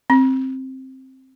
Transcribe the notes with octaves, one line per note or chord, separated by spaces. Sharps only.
C4